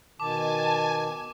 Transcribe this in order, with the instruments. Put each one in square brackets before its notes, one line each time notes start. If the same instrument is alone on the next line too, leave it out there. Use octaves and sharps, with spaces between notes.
[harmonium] B2 D#3 [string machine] G#5 [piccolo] A5 [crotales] D6